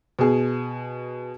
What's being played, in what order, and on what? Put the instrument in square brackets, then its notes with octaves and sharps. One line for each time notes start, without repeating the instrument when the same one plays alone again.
[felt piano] B2 G#4